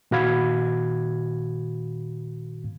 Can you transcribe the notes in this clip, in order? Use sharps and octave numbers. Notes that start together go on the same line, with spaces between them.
A#2 D#3 F#4 F5 B5 G#6